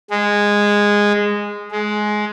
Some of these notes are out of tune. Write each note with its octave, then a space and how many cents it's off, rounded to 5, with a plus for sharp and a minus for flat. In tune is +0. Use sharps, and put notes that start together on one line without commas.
G#3 -15
G#3 +15